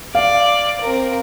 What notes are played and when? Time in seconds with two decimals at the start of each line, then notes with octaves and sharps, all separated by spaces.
0.15 D5 F5
0.81 C4 A#4